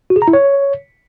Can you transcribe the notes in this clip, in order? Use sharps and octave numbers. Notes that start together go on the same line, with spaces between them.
F#4
G#4
A#5
E4
C#5